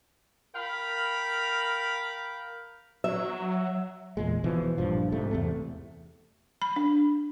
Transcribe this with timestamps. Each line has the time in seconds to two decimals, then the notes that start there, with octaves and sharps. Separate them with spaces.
0.54 A#4 F5 G5 B5
3.04 F#3 E5
4.17 E2 A#2 G#3
4.44 B2 E3 F3
4.78 A#1 G2 F3
5.12 G#2 C3 A3
5.31 E2 C3 A3
6.62 B5
6.76 D4